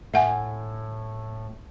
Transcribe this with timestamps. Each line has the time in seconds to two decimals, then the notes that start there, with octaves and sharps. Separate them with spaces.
0.14 A2 E5 F#5 G#5